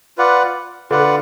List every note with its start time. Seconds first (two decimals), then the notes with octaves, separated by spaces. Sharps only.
0.18 F4 B4 D5 F#5
0.90 D3 F4 B4 D5 F#5